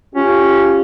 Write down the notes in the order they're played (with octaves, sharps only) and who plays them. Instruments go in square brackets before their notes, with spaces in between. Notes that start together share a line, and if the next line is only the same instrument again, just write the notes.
[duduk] C#4 [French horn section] F4 G4